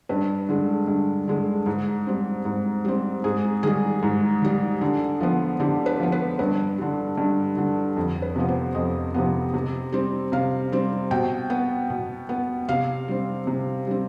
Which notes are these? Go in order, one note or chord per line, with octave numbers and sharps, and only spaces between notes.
G2 B4
D3 G#3
G2
D3 G#3
G#2
G3 C4
G#2
G3 C4
G#2 G#4
D#3 G3 G#4
G#2
D#3 G3
D3
F3 B3
D3 G4
B4
F3 B3
B4
G2 B4
D3 G3
G2
D3 G3
F2
B4
C3 F3 B3
C5
F2 D#5
C3 F3 B3
C3
G3 C4
C3 F5
G3 C4
B2 G5
B3
B2
B3
C3 F5
G3 C4
C3
G3 C4